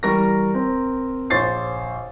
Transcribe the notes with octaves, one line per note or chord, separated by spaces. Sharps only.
E3 G3 A#4 C#6 A#6
C4 A#4
A#1 C5 C#5 C#6 A6 C7